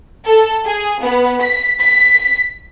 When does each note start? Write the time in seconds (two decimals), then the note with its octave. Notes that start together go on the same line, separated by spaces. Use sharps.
0.25 A4
0.65 G#4
1.02 B3
1.41 B6
1.81 B6